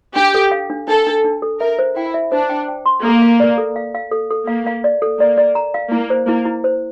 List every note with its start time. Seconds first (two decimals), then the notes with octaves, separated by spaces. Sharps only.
0.16 D4 G4
0.34 A4
0.51 F5
0.70 D4
0.87 D4 A4
1.07 D4
1.24 D4
1.42 A4
1.60 A#4 E5
1.79 C5
1.97 E4 G5
2.14 E5
2.32 D4 C5
2.49 G5
2.68 G5
2.86 C6
3.04 A#3 A4
3.22 F5
3.40 D5
3.58 A4
3.76 F5
3.95 F5
4.11 A4
4.31 A4
4.47 A#3 F5
4.67 F5
4.84 D5
5.02 A4
5.19 A#3 D5
5.38 D5
5.55 A#5
5.74 F5
5.92 A#3 E4
6.10 C5
6.28 A#3 E4
6.45 E4
6.64 C5